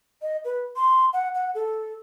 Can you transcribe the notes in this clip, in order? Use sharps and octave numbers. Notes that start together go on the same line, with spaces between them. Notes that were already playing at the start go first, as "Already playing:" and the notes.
D#5
B4
C6
F#5
F#5
A4